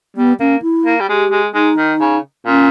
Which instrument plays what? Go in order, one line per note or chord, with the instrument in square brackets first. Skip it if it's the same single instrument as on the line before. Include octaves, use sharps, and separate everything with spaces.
[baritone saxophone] G3 [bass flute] B3
[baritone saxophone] A#3 [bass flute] C#4
[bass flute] E4
[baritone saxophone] A#3
G3
[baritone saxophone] G#3 [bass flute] G4
[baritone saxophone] G#3
[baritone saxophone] G#3 [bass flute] D#4
[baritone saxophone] D#3
C#3
[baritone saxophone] A#2 [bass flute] C#4